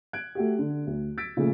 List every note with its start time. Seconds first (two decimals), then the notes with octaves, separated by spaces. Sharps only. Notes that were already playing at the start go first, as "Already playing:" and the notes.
0.13 F#6 G#6 D7
0.35 A3 F#4 G4
0.59 D3
0.87 D2
1.17 E6 G#6 A6 B6 D7
1.37 A#2 C#3 F3 A3